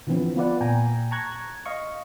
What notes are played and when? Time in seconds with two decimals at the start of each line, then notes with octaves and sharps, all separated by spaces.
0.07 D3 E3 F3 B3 C4
0.36 B3 F4 B4 D5 F#5
0.61 A#2 G5 G#5 A#5
1.11 A5 A#5 C#6 F#6 G#6
1.66 D#5 F5 C#6